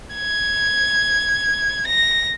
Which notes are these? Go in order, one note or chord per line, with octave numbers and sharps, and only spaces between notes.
G#6
A#6